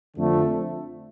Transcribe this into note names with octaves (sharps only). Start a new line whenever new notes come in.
F2 D3 F3 A3